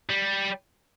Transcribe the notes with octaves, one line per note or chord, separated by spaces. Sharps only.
G3